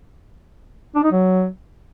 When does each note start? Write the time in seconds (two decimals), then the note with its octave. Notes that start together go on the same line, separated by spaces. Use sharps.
0.95 D4
1.03 D#4
1.12 F#3